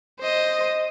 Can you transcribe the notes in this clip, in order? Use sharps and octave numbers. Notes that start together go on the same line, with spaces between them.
C5 D#5